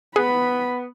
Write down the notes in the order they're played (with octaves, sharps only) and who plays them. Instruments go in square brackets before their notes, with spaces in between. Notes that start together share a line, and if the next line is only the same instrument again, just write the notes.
[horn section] B3 [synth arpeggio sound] G#4 [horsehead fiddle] B5